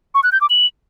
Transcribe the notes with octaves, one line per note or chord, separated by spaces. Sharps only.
C#6
F#6
G6
D6
F#7